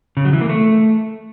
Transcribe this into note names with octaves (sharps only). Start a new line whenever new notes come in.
C#3
F#3
E3
A#3
A3